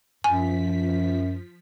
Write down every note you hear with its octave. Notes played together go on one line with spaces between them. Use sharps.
F#2 F3 G#5 B6